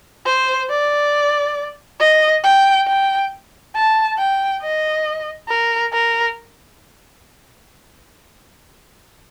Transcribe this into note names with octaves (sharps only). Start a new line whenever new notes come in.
C5
D5
D#5
G5
G5
A5
G5
D#5
A#4
A#4